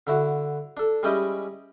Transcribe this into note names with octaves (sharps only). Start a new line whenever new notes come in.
D3 E4 F#4
D4 A4
G3 G#3 C#4 E4 G4 D#5